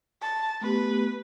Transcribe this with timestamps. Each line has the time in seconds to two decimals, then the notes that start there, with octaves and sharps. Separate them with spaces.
0.21 A5
0.61 A3 B3 G4 B4